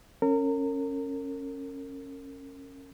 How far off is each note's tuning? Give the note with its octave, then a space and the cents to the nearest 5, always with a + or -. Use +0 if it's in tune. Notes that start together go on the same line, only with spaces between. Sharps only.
C#4 -15 A#4 -35